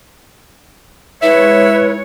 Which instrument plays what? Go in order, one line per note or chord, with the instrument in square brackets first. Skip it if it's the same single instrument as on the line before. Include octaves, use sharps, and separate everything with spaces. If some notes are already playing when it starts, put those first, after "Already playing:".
[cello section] G#3 C#5 [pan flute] E4 [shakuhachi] B4 [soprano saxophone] E5